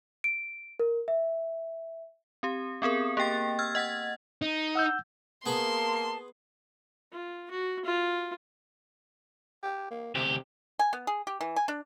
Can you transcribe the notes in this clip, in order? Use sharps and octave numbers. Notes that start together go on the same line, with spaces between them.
D7
A#4
E5
C4 G4
B3 C4 G#4 A#4
A#3 G4 G5 A6
E6 F6 G#6 A6
D#5 F#5 G#6 A6
D#4
F#5 E6 G6
A#3 B3 G#4 A5 B5 C6
F4
F#4
F4
G4
A#3
D2 C3 G4
G#5
B3
G#4
G4
E3
G#5
D4